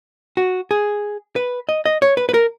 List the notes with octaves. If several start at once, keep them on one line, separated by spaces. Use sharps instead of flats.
F#4
G#4
B4
D#5
D#5
C#5
B4
B4
A#4